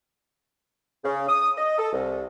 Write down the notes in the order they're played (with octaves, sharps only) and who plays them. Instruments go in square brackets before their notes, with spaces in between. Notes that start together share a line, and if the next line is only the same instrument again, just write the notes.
[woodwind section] C#3
D#6
D#5
A4
C2